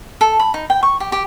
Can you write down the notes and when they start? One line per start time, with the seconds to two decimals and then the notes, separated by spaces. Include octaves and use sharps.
0.21 A4
0.39 B5
0.54 D#4
0.70 G5
0.83 C#6
1.00 G4
1.12 G4